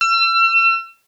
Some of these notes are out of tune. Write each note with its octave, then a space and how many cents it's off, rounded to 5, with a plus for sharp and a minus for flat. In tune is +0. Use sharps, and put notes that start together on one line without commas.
E6 +40